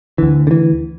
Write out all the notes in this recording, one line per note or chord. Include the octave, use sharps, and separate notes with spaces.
D2 D3 E3
D3
E3